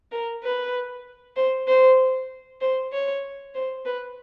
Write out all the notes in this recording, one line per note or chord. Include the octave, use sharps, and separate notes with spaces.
A#4
B4
C5
C5
C5
C#5
C5
B4